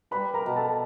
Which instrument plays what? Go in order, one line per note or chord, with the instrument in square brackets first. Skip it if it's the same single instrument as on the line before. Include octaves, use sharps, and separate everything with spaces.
[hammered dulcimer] G3 [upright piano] B4 B5
[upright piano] A#4 A#5
[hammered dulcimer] B2
[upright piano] A4 A5